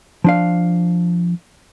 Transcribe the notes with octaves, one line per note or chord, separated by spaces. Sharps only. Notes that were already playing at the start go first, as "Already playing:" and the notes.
F3 D4 F5